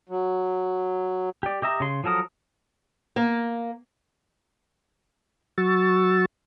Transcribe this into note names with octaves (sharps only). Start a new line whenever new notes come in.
F#3
G4 D5
G4 D#5 E5 A#5
C#3 C6
F3 F#3 A4 A#4 D#6
A#3
F#3 F#4 C#6 E6 A6